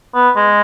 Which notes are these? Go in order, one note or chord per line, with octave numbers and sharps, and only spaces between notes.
B3
G#3